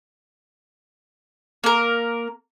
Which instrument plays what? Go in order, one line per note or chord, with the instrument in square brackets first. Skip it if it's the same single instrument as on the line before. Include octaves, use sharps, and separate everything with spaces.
[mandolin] A#3 A#4